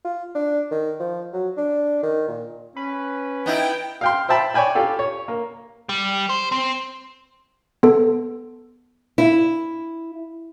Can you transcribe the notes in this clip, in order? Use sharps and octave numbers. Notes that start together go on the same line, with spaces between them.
F4
D4
D#3
F3
F#3
D4
D#3
A#2
C#4 B4
B3 D#4 E4 G5
F5 G5 C6
C5 E5 G5 A5 B5
C#5 D5 G5 G#5 B5
F4 G4 A4
C#5
A#3
G3
C5
C4
B3 A4
E4